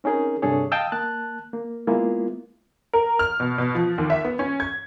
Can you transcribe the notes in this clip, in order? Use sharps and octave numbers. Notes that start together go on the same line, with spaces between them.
C4 C#4 D#4 G#4 A#4
G2 C3 D4 G#4 A4 C#5
D#5 F5 G5 A5 D#6 E6
A#3 A5 F#6
A#3
G#3 A#3 B3 E4 F4
A#4
F6
B2
B2
F3
D#2
E5
B3
C#4
G#6